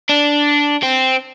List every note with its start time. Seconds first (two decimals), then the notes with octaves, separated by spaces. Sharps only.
0.09 D4
0.83 C4